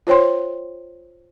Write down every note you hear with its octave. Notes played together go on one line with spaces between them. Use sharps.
F4 C5 C#5 G5 C6